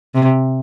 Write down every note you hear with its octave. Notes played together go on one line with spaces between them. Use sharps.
C3